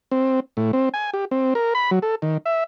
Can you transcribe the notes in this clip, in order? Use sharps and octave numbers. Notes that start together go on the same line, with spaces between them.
C4
A2
C4
G#5
G4
C4
A#4
B5
F#3
A4
D#3
E5